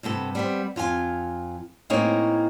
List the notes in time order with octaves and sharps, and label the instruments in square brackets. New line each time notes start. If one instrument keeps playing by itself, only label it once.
[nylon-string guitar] G2 C3 B3 A4
G3 B3 C4
F2 F4 G#4 G#5
A2 A#3 C4 D#4 G#4 C#5